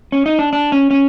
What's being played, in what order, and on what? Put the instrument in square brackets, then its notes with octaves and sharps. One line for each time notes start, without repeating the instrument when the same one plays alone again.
[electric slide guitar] C#4
D#4
D4
D4
C#4
C#4